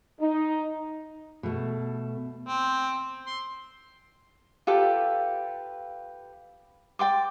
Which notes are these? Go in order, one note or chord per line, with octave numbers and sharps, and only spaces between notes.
D#4
B2 A3
C4
C6
F4 G4 A4 B4
D5 G5 C6 D6